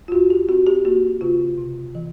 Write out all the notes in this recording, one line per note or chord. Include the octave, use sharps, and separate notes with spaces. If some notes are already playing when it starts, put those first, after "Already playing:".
F4
E2 F#4
G4
C4 F#4
G4
A#3 F#4
C#3 F4
C3
E3